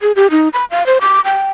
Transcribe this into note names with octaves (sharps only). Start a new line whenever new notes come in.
G#4
G4
D#4
B5
F5
C5
D6
G5